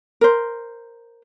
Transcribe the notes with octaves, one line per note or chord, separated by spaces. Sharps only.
A#4 C5